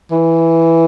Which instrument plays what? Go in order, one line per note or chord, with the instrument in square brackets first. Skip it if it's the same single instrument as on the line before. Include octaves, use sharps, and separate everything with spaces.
[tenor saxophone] E3